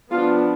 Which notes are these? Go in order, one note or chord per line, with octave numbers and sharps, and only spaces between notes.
F3 B3 D4 F4